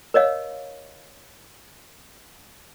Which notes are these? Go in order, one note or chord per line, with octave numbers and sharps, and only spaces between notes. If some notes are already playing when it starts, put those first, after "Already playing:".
A#4 C#5 D#5 F5